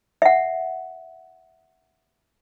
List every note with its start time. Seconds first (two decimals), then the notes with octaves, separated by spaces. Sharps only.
0.22 E5 F#5